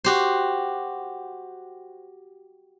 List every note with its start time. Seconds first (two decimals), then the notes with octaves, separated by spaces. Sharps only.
0.04 F#4 G4 C5